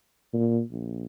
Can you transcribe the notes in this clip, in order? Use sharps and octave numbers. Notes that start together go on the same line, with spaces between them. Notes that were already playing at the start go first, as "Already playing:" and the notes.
A#2
A#1